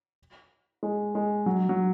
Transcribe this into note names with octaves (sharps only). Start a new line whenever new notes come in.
G#3
G#3
F#3
F#3